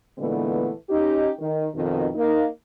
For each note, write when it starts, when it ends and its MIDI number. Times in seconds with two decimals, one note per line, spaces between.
0.19 0.70 46
0.19 0.70 50
0.19 0.70 52
0.19 0.70 56
0.19 0.70 57
0.19 0.70 59
0.90 1.31 61
0.90 1.31 63
0.90 1.31 67
1.40 1.68 51
1.75 2.08 41
1.75 2.08 47
1.75 2.08 51
2.15 2.45 58
2.15 2.45 63